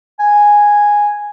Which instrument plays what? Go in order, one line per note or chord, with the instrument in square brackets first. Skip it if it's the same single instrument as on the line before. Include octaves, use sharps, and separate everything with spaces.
[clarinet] G#5